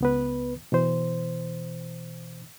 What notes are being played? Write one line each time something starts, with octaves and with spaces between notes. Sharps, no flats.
C#2 B3 B4
B2 E3 C5